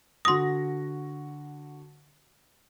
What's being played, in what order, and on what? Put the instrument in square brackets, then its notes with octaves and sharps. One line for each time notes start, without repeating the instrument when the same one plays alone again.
[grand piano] D3 F#4 A#6 [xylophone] C6 D#6